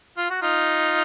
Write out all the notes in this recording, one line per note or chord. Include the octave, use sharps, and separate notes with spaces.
F4
F#4
D#4 F4